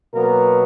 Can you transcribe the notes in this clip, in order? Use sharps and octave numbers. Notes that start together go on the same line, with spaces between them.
B2 F#3 A#3 B3 A#4